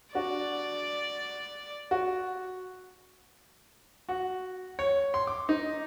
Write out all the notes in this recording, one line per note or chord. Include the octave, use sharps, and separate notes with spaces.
D4 F#4 D5
F#4
F#4
C#5
C6
D6
D#4